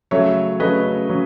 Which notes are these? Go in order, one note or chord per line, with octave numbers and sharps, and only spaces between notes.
C#3 F#3 A3 C#5 E5
C#3 F#3 A3 B4 D#5
C#3 F#3